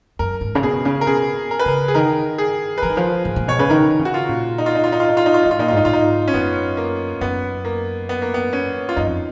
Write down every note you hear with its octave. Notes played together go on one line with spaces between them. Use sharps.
F#2 A#4
G#2
C#3
B2 G#4
C#3
A#4
B2 G#4
A#4
B4
C#3 A#4
G#4
D#3 A#4
G#4
B4
F3 A#4
D#3
F3
G#2
A#2
B2 C#5
C#3 B4
D#3 A#4
C#3
F#4
F4
A#2
D#4
F4
D#4
F4
D#4
F4
D#4
F4
D#4
F4
G#2 D#4
F4
A#2 D#4
F4
G#2 D#4
A#2 F4
D#4
G#2
C#4
F#2 B3
A#3
F#2 B3
A#3
B3
A#3
B3
C#4
F4
F#2 D#4
F2